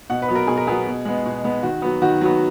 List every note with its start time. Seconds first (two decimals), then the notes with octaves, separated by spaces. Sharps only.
0.10 B2 F#5
0.22 B4
0.28 F#3 B3
0.35 A#4
0.47 B2 G#4
0.57 A#4
0.67 F#3 B3 G#4
0.87 B2
1.05 G#3 B3
1.25 B2
1.44 G#3 B3
1.63 D#3 F#4
1.82 F#3 B3
2.02 D#3 F#4
2.21 F#3 B3